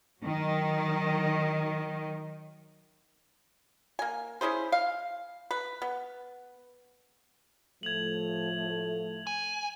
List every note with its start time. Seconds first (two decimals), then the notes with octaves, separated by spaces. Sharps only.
0.19 D#3 F#3
3.99 A#3 G#5
4.41 C#4 E4 G#4 C5
4.72 F5
5.51 B4
5.82 B3
7.83 A2 F3 A3 G#6 F7 F#7
9.27 G#5